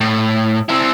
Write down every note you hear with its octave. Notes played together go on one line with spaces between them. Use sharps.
A2
C4 E4